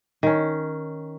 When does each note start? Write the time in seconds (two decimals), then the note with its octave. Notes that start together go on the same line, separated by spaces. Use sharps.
0.23 D#3 C#4